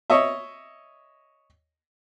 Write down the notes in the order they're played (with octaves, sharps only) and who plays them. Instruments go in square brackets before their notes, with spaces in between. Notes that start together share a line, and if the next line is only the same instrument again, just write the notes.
[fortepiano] C#5 D#5 E5